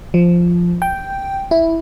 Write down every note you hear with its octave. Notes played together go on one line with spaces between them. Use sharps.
F3
G5
E4